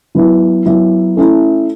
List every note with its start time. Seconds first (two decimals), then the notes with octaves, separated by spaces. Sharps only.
0.15 F#3 B3 E4
0.66 F#3 B3 E4
1.16 A3 C#4 E4